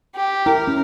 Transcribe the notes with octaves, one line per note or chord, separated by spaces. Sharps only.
G4
E4 A#4
C#4